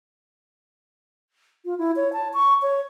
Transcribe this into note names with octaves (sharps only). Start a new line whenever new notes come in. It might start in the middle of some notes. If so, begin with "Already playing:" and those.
F4
E4
C#5
A5
C#6
C#5